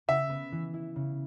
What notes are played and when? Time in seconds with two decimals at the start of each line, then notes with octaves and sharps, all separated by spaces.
0.08 C#3 E5
0.30 B3
0.52 E3
0.74 E4
0.96 C#3